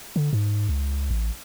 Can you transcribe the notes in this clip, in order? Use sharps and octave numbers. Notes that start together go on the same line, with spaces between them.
D3
G#2
C#2
A1